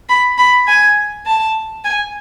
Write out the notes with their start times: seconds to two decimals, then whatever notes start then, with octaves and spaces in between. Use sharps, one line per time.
0.09 B5
0.38 B5
0.67 G#5
1.26 A5
1.84 G#5